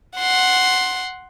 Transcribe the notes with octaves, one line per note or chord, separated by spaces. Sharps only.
F#5 C6